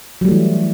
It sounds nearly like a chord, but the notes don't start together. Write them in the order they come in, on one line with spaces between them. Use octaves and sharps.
F#3 G3 A3 E3